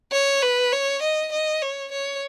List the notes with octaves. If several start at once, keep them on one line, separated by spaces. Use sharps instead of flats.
C#5
B4
C#5
D#5
D#5
C#5
C#5